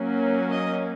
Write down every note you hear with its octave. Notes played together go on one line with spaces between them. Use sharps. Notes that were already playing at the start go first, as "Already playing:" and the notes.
Already playing: F#3 A#3 C#4
D#5